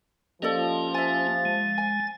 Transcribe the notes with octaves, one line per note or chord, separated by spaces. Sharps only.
F3 A#3 C#4 G4 A4 D5 D#5
E5 G#5 A6
G#3
G#5